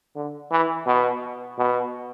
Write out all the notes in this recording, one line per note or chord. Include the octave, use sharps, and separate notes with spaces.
D3
E3
B2
B2